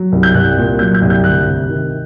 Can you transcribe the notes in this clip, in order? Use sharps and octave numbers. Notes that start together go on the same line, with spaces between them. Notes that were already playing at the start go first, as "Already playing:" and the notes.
Already playing: F#3
C2
G6
C2 F#6
A#2
F#3 G6
G6
C2
G6
D2 F#6
C3
D#3